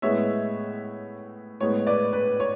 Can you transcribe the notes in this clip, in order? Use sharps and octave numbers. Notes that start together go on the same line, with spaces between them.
A2 G#3 B3 C#5 E5
A2 G#3 B3 C#5
B4 D5
B4
C#5